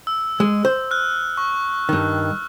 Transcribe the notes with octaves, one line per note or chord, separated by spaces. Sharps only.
E6
G#3
C5
F6 F#6
C#6
G2 D#3